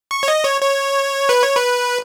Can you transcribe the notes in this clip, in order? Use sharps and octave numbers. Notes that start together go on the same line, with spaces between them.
C#6
C#5
D#5
C#5
C#5
B4
C#5
B4